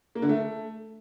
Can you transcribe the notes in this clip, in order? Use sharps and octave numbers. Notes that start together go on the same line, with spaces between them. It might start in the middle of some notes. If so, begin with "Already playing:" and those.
A#3
D3
A3